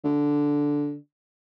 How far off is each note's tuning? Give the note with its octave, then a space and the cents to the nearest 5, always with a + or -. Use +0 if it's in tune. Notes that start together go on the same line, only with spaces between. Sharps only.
D3 -5